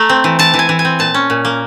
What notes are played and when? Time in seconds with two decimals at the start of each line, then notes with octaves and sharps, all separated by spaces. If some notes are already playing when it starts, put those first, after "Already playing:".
Already playing: A3 A#5
0.09 C4
0.24 E3
0.39 E3 A5
0.54 E3
0.59 G#5
0.69 E3
0.79 G#5
0.85 C4
0.99 A#2 A5
1.14 C#4
1.30 A#2
1.45 A#3